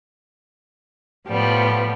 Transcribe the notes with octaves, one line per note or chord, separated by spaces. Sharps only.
A2 F3 G3 B3